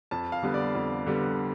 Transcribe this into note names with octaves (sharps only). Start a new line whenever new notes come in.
F2 A5
F5
D3 G3 B3
D5
F2
D3 G3 B3